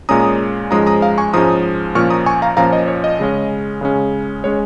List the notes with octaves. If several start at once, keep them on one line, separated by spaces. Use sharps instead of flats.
A#2 G#3 C#4 A#5 D#6
G#2 F3 G#3 C#4 A#5 D#6
A#5 D#6
F5 A#5
G#5 C#6
G#2 F3 G#3 C#4 A#5 D#6
A#2 F3 C#4 C#6 F6
A#5 D#6
G#5 C#6
F5 A#5
A#2 F3 C#4 F5 A#5
D#5
C#5
D#5
C#3 G#3 C#4
C#3 G#3 C#4
G#3 C#4 C#5